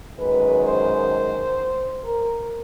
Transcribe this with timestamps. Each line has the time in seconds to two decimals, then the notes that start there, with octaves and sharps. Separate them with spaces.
0.17 F#2 D#3 G#3 B4
0.63 C5
2.05 A#4